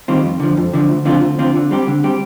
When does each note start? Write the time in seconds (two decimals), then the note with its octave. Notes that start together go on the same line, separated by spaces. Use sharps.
0.08 D#3 G3 C4 F4
0.24 F2
0.40 D3 F3
0.57 F2
0.74 D3 F3
0.89 D2
1.05 D3 F3 C4 F4
1.22 D2
1.39 D3 F3 C4 F4
1.55 D3
1.71 G3 C4 G4
1.88 D3
2.03 G3 C4 G4